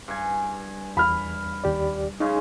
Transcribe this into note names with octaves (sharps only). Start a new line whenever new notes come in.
G2 G#5
E2 B5 F6
D#2 G4 D5
C#3 G#3 C#4 D#4